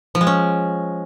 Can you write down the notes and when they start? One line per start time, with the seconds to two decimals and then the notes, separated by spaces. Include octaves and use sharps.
0.15 F3
0.21 G#3
0.27 C#4